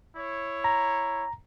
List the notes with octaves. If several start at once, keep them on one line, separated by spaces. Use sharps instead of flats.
E4 C#5
A#5